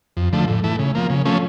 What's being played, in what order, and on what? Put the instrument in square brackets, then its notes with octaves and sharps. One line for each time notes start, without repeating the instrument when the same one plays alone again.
[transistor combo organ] F2
D3 F3 A3
A2
E3 A3
C#3
F3 A#3
C#3
F3 A3 C#4